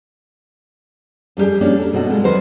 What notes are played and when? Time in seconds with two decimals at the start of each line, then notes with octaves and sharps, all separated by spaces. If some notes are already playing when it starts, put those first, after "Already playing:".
1.37 F2 G3 D4 G4 G#4
1.61 A#3 B3 C#4 D4 F#4
1.78 A4 A#4
1.93 B2 C4 F#4 A4
2.09 G#3 C4 F4
2.24 E2 D#3 F#3 F#4 B4 C5